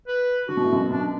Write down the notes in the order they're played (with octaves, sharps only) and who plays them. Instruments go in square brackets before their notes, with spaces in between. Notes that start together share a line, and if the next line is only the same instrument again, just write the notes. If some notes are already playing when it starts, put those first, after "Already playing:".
[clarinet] B4
[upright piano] D3 [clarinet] F#4
[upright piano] B2
A2
F#2 B2
[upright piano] F#2 B2 [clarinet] D4